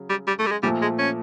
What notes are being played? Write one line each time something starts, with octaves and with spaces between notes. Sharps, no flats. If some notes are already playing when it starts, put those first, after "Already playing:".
Already playing: C#3 F#3
G3
G3
A3
G3
G#3
A#2 F3 G3 A3
G#3
C#4